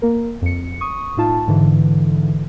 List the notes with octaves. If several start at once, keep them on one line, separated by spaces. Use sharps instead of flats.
A#3 A#4
F2 C#7
C#6 D#6
A2 D#4 F4 A5
G#2 D3 E3